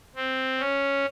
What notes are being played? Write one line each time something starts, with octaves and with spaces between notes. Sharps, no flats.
C4
C#4